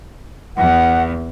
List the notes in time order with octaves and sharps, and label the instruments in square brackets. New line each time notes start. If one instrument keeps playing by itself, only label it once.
[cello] E2 [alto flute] F#5